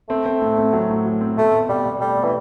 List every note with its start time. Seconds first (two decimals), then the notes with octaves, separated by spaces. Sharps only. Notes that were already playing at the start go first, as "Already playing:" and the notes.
0.09 A3 C4
0.25 C4
0.41 A2
0.57 C4
0.73 F#3
0.90 A2
1.06 F#3
1.21 C4
1.38 B2 A3
1.53 B2
1.69 B2 G3
1.85 B2
2.01 G3 A3
2.17 B2
2.24 E3